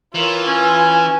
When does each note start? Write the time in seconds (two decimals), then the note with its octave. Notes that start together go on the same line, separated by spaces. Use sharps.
0.15 E3 F4 A#4 C#5
0.48 C#4 B4 G#5